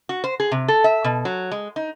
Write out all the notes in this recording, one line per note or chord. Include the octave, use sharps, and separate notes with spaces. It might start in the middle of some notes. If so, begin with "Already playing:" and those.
F#4
C5
G#4
C3
A4
E5
B2
F#3
G#3
D#4